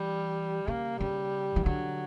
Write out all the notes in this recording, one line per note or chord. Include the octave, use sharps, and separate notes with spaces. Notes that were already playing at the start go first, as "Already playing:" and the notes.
Already playing: E3 G3
C#3 A#3
C#3 G3
E3
D3 F#3